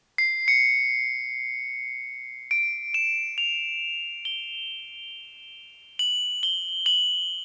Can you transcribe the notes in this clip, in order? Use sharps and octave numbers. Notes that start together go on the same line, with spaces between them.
C7
C#7
D7
E7
F7
G7
F#7
G7
F#7